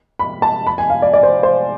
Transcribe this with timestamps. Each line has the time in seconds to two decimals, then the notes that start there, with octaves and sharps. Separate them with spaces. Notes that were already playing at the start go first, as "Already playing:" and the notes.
0.19 B5
0.42 A5
0.67 B5
0.78 G#5
0.90 F5
1.02 D5
1.13 D5
1.23 C5
1.43 C5